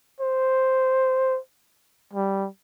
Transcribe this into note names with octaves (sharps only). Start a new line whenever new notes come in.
C5
G3